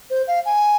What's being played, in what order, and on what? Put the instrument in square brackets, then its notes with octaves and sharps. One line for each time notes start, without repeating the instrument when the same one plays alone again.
[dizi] C5
F5
G#5